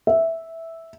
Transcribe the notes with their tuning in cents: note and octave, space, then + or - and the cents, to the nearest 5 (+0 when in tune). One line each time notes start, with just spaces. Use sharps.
E5 -5